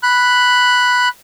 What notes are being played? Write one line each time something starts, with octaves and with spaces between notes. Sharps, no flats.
B5 F#6